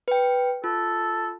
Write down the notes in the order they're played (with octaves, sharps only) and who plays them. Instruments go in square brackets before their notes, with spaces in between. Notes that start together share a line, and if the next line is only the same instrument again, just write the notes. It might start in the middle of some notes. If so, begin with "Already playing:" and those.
[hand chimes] B4 G5
[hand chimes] F4 [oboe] A4